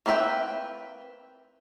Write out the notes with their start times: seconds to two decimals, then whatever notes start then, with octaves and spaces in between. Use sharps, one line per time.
0.06 A#3 C4 B4 E5 G5